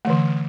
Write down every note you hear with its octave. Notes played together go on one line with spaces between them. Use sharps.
D3 E3 A3